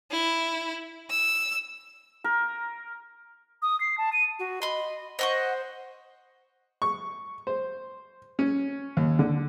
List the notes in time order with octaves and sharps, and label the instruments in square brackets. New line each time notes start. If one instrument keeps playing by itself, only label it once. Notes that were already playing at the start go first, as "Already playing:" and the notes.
[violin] E4
E6
[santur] A#4
[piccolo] D#6
C7
A5
D#7
[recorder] F#4
[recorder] D#5 [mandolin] B5 C6
[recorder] C5 [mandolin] D#5 F#5 C#6
[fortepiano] C#6
C5
C#4
D#2
D3